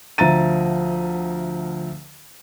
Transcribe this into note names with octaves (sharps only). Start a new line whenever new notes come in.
D2 F3 E5 A#5 A6 D#7